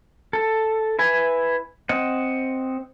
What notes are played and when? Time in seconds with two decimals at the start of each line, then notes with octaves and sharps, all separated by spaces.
0.33 A4
0.99 E4 B4 G#5
1.89 C4 D#5 F#5